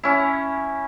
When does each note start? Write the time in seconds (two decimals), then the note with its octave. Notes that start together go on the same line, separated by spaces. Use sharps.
0.03 C#4 E4